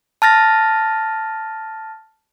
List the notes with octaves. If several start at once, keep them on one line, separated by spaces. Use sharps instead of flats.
A5 F6 A6 A#6